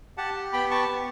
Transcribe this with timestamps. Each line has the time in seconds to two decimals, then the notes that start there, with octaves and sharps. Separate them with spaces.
0.17 G4 F#5 A5
0.53 B3 G5 B5
0.71 A5 C#6
0.89 B3